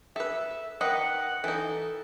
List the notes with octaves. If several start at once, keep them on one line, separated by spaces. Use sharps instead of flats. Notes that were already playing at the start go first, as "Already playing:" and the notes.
A4 B4 E5
D#3 B4 D#5 F#5
E3 D#4 A4